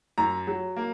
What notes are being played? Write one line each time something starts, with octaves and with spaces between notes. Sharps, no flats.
F#2 A#5
F#3
A#3